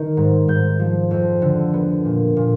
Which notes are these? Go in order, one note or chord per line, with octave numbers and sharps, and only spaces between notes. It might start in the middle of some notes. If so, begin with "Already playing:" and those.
Already playing: D#3
G#2
G#2 G6
F3
F2
D3
B3
A#2
A#2